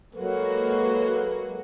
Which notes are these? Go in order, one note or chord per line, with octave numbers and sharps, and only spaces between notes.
F#3 G#3 A#3 F#4 A4 B4